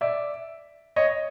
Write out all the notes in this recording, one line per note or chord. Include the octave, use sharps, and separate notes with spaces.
D5 E5
C#5 D#5